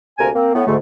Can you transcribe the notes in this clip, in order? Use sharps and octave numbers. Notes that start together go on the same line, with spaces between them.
D2 C3 A#3 A#4 G#5
A#3 C4
A2 B3
D2 G#2 D3 A3